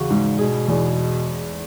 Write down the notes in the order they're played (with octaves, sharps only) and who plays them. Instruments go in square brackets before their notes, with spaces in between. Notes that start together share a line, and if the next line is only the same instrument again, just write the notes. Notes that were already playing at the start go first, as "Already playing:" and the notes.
Already playing: [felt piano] E2 F#4 [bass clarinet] C#3
[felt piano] G#2
[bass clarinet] B2 [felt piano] G#4
[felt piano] E2